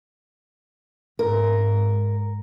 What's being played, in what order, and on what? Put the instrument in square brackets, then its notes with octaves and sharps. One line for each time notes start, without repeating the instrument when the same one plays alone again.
[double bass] G#2 [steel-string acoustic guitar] A#4